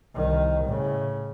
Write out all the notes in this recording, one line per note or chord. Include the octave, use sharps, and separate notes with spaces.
C2 D#3
A2 C#3